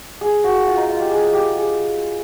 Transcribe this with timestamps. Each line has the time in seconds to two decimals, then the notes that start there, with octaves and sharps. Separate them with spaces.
0.21 G#4
0.44 F#4
0.67 F4
0.77 D#4
0.89 F4
1.00 G4
1.11 G#4
1.33 G4
1.56 G#4